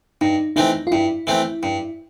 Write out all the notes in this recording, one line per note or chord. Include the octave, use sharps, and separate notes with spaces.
G2 D#4
E3 A3 C4 D#4
F4
G2 E4
E3 A3 C4
G2